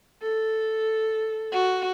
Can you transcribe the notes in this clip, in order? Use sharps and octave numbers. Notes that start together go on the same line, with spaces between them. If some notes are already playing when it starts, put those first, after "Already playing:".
A4
F#4